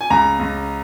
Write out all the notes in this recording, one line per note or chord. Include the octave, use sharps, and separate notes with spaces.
G#5
C#2 A#5
C#2